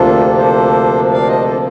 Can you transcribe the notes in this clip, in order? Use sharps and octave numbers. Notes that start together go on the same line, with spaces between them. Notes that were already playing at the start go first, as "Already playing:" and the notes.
Already playing: D2 C3 F3 A#3 D4 F4 A4
A4 C5
D5 F5
C5 D#5
F4 A4
D4